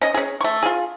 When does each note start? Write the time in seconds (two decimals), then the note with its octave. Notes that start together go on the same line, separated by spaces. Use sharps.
0.01 C#4 D#5
0.14 C#4 G#4
0.41 A3 C#6
0.63 F4 G#4